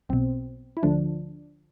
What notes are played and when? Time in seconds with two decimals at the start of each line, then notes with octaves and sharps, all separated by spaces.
0.09 B1 B2 C4
0.77 E4
0.83 D2 D3 F3 D4